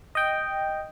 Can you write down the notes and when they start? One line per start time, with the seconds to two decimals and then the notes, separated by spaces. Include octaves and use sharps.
0.15 D#5 G5